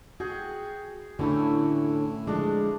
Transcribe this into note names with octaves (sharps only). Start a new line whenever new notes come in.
F#4 G#4 G5
A2 D3 E3 A3 C#4 E4 F#4
D3 F3 G#3 D4